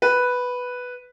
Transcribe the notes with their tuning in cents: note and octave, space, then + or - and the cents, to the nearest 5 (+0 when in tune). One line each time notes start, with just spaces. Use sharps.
B4 +0